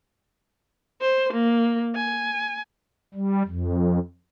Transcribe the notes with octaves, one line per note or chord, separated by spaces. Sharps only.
C5
A#3
G#5
G3
F2